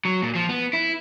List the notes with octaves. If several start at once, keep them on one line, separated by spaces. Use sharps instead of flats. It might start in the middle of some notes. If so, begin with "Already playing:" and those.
F#3
A#2
F3
B3
E4